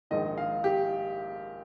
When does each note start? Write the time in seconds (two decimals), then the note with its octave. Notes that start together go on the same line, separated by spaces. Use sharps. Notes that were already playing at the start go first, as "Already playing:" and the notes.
0.11 A#1 G#2 D#3 A#3 D#5
0.38 F5
0.64 G4